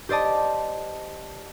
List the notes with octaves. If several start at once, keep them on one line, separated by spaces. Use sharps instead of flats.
G4 C5 D5 D#5 A5